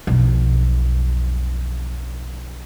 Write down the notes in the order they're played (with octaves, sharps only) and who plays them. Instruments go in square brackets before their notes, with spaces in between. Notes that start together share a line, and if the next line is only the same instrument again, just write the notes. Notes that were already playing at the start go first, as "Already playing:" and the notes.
[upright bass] B1 F2